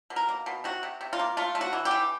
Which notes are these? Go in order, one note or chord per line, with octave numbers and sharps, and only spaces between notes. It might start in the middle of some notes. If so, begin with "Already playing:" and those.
B2
A#4
A#3
B2
C3 F#4
C3
C3
F4
A#3
A3 F4
A3
F#4
E3
G4
E3